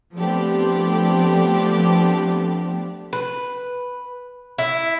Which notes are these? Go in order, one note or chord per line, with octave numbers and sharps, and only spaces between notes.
F3 A3 B3 C4 D4 G4
B4
E4